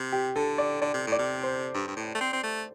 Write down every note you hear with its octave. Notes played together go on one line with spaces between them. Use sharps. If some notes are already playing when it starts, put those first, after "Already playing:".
Already playing: C3
G4
D3 A4
D5
D3 D5
C3
A2
D5
C3
C5
G2
G2
A2
A3
C4
C4
A3